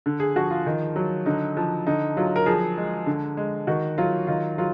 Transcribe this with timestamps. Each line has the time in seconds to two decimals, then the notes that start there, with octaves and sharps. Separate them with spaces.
0.06 D3
0.20 G#4
0.36 F3 F#4
0.51 F4
0.66 D#3
0.96 F#3
1.26 D3 D#4
1.57 F3
1.87 D3 D#4
2.17 F#3 F4
2.36 A#4
2.46 F3 G#4
2.77 G#3
3.06 D3
3.37 G#3
3.67 D#3 F#4
3.98 F#3 F4
4.27 D#3 F4
4.58 F#3 F4